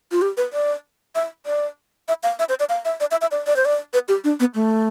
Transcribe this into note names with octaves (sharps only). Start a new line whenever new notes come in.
F4
G4
B4
D5
E5
D5
E5
F5
E5
C5
D5
F5
E5
D5
E5
E5
D5
D5
C5
D5
B4
G4
D4
B3
A3